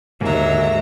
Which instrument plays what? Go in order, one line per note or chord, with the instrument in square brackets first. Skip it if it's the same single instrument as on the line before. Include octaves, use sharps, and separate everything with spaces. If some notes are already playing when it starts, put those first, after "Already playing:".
[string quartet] D#2 F#3 A#5 [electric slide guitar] G#2 [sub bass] D3 [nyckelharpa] A#4 E5